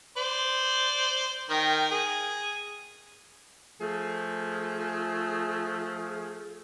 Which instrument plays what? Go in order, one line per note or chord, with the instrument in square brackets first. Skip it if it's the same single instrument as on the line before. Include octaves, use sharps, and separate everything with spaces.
[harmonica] C5 D5
D#3 A#4 G5
G#4
[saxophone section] F3 A3 G#4